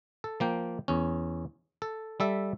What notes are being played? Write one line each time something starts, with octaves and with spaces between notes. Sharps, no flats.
A4
F3 A#3 G5
E2 C#4
A4
G3 A4 E5